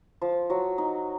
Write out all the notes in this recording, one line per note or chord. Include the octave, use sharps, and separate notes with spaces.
F3 F4
F#3 F#4
D#4